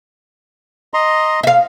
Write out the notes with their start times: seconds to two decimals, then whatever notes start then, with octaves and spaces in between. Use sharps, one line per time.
0.94 D#5 A#5 C6
1.43 E5 F5